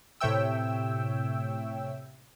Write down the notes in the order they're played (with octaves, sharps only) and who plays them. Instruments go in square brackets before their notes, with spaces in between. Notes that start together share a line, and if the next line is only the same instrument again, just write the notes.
[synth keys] A2 C3 C#5 E5 G5 E6